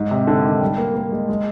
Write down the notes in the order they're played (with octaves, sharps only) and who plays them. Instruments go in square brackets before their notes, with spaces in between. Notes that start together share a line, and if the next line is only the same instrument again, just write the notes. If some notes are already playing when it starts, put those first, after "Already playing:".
Already playing: [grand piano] G#2
C3
D3
D#3
G3
A#3
A#3
G#3
G#3